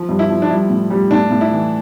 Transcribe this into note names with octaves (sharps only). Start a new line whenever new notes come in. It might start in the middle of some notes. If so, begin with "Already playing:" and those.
Already playing: F3
G2
E4
F3
D4
G3 E4
A2
G3
A2 D4
A2
E4
E3